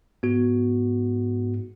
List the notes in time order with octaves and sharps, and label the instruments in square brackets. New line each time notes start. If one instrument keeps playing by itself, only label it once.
[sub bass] G#2 [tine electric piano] B3 F#4